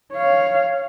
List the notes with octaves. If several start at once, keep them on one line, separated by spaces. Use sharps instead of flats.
C#5 F5